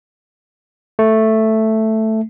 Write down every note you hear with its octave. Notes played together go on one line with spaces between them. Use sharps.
A3